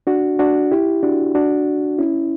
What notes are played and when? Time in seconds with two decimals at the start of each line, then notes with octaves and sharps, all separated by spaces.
0.07 D4 F#4
0.39 D4 F#4
0.71 E4 G4
1.03 D4 F#4
1.35 D4 F#4
1.98 C#4 E4